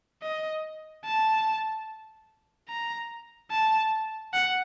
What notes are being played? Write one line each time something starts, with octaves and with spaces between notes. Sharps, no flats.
D#5
A5
A#5
A5
F#5